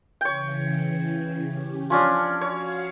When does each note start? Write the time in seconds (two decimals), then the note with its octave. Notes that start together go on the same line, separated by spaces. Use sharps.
0.21 C#3 E3 C#5 G5
1.49 C#4 G4
1.90 F3 C#4 D4 D5
2.41 F#4 C#5 F5